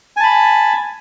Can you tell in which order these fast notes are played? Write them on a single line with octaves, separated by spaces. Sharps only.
G#5 A5 B5